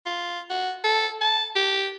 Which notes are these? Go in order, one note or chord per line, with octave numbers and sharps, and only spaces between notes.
F4
F#4
A4
A5
G4